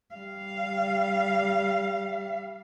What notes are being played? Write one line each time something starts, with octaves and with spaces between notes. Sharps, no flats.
G3 F5